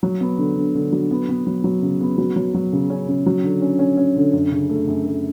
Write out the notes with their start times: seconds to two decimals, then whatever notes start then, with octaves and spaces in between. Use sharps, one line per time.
0.03 F#3
0.21 B3
0.38 D3
0.56 D3
0.75 D3
0.92 F#3
1.11 B3
1.29 B3
1.47 F#3
1.64 F#3
1.82 C#3
2.01 B3
2.18 F#3
2.36 F#3
2.54 F#3
2.73 C#3
2.90 C#4
3.08 C#3
3.26 F#3
3.43 D3
3.62 C#4
3.79 C#4
3.97 C#4
4.16 D3
4.33 F#2
4.52 C#3
4.70 A3
4.88 F#2
5.06 A3